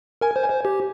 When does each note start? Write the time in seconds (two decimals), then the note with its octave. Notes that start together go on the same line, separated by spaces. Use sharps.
0.21 A#4 G#5
0.36 C5
0.43 G#5
0.50 C5
0.65 G4